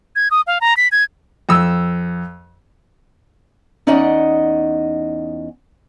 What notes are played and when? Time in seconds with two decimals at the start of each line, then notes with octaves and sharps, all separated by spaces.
0.16 G#6
0.31 D#6
0.47 F5
0.61 A#5
0.77 B6
0.92 G#6
1.49 F2 E6
3.87 E2 C#4 D#4 D5 D#5 F#5